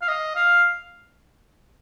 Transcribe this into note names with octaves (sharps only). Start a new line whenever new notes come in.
F5
D#5
F5